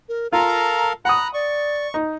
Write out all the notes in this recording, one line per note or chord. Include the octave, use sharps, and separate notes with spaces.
A#4
F4 A4 A#4 F5 A#5
F#5 A#5 B5 D#6 F#6
D5 C#6
D#4